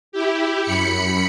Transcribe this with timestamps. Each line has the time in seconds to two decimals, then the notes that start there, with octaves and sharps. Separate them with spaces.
0.12 E4 G4
0.62 F#2 B5 C#7